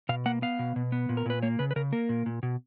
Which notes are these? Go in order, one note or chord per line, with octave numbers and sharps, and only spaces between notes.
B2 F5
A#3 F#5
B3 F5
B2
B2
B3
A#2
A#4
A#2 B4
A#3 C#5
C#3 B4
B4
C#3 A#4
A#3 A#4
A#2
A#2
B2